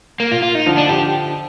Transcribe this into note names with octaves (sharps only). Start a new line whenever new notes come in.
A#3
F4
F4
D#4
D3 F3
D4
G4